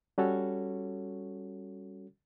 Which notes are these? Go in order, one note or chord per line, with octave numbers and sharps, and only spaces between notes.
G3 C#4 F#4 A4 C#5